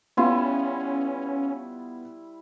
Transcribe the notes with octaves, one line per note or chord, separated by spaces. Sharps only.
G3 B3 C#4 E4 F4 C6